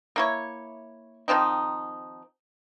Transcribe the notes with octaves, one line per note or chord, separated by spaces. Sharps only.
A#3 E4 C#5
D#3 F3 C4 D#4